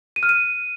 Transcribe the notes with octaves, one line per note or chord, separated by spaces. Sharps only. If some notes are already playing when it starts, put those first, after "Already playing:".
D#7
F6
D#7